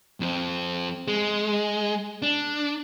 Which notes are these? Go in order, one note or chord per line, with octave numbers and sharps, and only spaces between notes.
F2 C4
G#3
D4